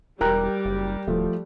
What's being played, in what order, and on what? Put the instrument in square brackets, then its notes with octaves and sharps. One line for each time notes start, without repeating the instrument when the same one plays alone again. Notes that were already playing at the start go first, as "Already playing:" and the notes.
[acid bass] E1 [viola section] G3 [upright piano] A#4 [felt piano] G5 A#5 F#6
[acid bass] F#1
[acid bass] D1 [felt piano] F3 A3